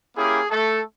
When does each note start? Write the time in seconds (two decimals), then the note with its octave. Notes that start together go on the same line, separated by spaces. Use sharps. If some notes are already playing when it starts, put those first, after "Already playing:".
0.16 A#3 C#4 E4 G4 G#4
0.50 A3 A4